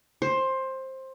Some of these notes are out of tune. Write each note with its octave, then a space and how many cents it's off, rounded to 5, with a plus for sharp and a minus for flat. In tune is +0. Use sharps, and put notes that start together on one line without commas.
C5 +15